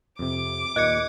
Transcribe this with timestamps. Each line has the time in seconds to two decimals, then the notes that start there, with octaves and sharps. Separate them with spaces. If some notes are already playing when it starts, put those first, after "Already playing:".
0.19 F2 C3 D6
0.76 D#2 A#2 D#5 F#6 G#6 C#7